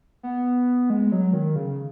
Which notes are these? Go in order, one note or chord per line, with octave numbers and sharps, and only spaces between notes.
B3
G#3
F#3
D#3
C#3